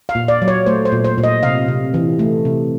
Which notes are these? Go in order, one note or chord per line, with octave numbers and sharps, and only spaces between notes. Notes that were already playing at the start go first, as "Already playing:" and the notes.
F5
A#2
D5
F#3
C#5
A3 C5
C5
A#2
C5
A#2
D#5
C3 F5
C3
E3
A3
C3